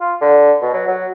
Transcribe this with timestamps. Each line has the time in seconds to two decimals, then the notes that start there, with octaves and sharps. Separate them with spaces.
0.01 F4
0.21 D3
0.62 B2
0.74 F#3
0.87 F#3